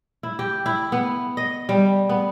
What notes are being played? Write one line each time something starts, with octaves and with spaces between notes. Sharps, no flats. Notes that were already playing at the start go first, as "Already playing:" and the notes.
E4
G4
E4
B3
D#5
G3
B3